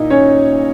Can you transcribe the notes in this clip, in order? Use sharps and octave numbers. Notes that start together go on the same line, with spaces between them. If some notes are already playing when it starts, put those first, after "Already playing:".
Already playing: A#2 D#4 E4 D#5
C#4 C#5